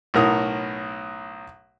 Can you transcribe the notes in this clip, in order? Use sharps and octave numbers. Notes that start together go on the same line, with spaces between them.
B1 A2 A#4 D#6